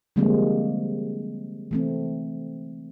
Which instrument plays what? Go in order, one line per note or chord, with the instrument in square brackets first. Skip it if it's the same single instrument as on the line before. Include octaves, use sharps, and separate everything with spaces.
[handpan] D3 F3 G3 G#3 A#3 C4
E3 A3 C4